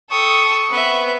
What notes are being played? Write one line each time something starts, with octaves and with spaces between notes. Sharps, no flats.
A4 G5 C#6 D#6
B3 C4 B4 E5